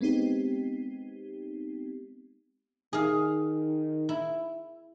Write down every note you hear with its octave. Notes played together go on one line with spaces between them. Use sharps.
G#3 B3 C4 D#4 G4
D#3 G#4 F5
E4